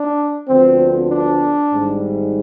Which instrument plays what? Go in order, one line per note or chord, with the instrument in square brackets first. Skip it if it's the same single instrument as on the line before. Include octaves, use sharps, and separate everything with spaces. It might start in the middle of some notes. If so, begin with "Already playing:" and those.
Already playing: [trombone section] D4
D2 D3 F3 B3 C4
D4
G#1 G#2 G3